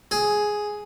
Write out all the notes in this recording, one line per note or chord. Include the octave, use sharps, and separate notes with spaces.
G#4